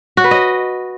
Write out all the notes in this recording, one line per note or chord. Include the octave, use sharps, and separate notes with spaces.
F#4
B4
D#5